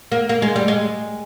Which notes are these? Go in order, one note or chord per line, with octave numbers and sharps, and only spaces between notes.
A#3
A#3
G#3
G3
G#3